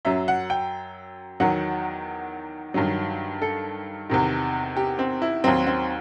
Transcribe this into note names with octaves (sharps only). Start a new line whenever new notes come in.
F#2 F#3 E5
F#5
G5
E2 D#3 F#3 F#5
G2 D#3 F#3
A4
E2 C3 D#3
G4
C4
E4
D#2 D#3 F#3 C4
C4